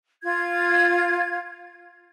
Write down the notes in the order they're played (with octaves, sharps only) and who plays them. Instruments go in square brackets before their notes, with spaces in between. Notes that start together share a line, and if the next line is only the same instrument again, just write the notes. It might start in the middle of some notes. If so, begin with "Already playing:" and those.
[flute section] F4 G#6